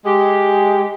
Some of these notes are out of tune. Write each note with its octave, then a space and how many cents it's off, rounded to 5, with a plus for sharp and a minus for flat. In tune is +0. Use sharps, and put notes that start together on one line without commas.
G#3 +0 G4 +0